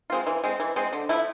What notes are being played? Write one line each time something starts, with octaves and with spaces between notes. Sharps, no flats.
G#3 C4 F4
E3
G#3 C4
E3
G#3 C4
D3
F3 A3 E4